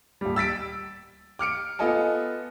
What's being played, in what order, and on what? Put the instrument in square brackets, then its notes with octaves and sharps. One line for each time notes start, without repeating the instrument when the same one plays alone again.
[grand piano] D#1 G3
E6 A6 B6 D7
D6 F6 C#7 D7
B3 F4 A4 D#5 G#5 A5